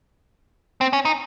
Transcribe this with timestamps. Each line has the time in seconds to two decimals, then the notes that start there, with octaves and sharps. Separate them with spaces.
0.81 C4
0.93 C#4
1.05 D#4